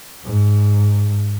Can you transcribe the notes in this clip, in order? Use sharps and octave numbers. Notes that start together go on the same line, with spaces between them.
G#2